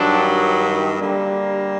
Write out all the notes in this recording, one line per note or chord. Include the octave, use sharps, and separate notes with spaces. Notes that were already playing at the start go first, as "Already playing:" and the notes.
Already playing: G2 D#3 F#3 D4
D3 G3 A#3